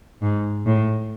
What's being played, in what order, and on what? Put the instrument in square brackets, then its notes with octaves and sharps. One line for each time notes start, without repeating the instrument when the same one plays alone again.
[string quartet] G#2
A2